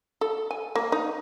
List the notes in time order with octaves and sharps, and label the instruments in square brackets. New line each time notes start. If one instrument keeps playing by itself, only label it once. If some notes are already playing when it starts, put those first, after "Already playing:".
[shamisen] A4
G#5
A#3
D#4